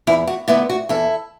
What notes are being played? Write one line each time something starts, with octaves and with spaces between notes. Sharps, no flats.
E2 E4
F#4
D3 B3 E4 A4
F#4
E2 E4 A4